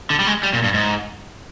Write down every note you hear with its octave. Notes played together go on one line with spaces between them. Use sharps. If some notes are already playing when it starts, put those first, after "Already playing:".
D3
G3
G#3
G3
A#2
G2
G#2